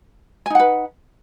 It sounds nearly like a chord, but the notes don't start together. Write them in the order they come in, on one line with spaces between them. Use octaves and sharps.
G#5 D#4 F#5 B4